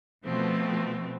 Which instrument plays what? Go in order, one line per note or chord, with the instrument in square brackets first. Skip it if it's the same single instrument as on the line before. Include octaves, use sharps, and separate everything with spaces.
[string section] B2 F3 A3 B3 C4